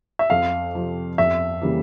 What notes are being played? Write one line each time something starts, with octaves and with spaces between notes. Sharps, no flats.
E5
F2 F5
C3 F3
F2 E5
C#3 E3 G3 A#3